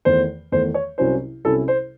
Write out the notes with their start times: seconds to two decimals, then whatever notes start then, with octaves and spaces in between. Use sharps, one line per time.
0.05 E2 D#3 A3 C5
0.52 E2 D#3 A3 C5
0.74 C#5
0.98 C2 C3 F#3 C#4 E4 C5
1.45 C2 C3 F#3 C#4 E4 A4
1.68 C5